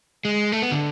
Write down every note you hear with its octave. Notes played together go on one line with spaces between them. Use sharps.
G#3
A3
B3
D3